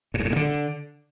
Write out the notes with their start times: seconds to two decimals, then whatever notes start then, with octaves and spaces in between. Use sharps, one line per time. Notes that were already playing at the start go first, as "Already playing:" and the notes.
0.14 A2
0.20 G2
0.25 A2
0.31 A#2
0.36 D3